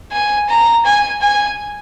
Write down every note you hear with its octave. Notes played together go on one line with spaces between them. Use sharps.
G#5
A#5
G#5
G#5